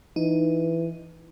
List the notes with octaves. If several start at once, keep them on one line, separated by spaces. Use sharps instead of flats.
E3 D#4